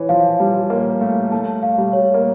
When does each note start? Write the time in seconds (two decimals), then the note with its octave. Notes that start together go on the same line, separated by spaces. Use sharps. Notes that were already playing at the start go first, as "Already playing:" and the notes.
Already playing: E3 C#5
0.09 F3 F5
0.39 G3 A5
0.70 A#3 C#5
1.01 A3 F5
1.32 A3 A5
1.63 F5
1.78 G3
1.93 C#5
2.14 A#3